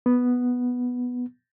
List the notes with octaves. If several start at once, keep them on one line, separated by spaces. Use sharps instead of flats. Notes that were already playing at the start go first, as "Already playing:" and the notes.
B3